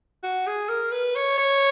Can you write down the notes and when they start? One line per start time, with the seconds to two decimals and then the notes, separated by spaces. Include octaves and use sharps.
0.23 F#4
0.47 G#4
0.68 A#4
0.92 B4
1.15 C#5
1.38 C#5